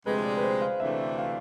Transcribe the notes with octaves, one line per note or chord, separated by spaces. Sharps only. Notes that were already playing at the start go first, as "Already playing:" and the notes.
D2 C3 F3 G#3 B4
D5
B4
C5
F5
D2 C3 E3 A3 D4 E5
F5